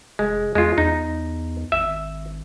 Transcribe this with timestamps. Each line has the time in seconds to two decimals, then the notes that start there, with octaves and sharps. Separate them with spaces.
0.19 F1 G#3
0.55 E2 G#3 F4
0.78 E2 D#4
1.72 G#1 E5